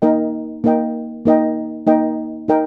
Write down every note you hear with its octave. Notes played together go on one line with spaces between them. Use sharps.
A#3 D#4 A#4 D#5 G5
A#3 D#4 A#4 D#5 G5
A#3 D#4 A#4 D#5 G5
A#3 D#4 A#4 D#5 G5
D#4 A#4 D#5 G5